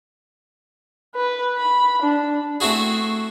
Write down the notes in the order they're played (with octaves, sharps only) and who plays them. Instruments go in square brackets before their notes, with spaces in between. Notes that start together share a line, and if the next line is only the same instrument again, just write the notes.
[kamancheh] B4
B5
D4
[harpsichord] A3 C4 E4 F#4 G#4